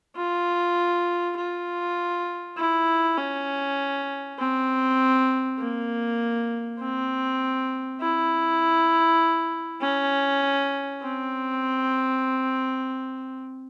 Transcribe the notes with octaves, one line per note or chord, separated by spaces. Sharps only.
F4
F4
E4
C#4
C4
A#3
C4
E4
C#4
C4